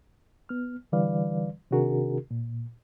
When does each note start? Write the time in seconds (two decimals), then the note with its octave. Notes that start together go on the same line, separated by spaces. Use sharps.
0.49 B3 F6
0.92 D3 E3 G3 B4 D5 F5
1.71 C3 D#3 D4 F#4 G#4 A#4
2.31 A#2